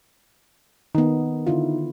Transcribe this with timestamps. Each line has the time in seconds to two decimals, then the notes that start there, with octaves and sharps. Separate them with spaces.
0.95 D#3 B3 D#4
1.47 D3 E4 F4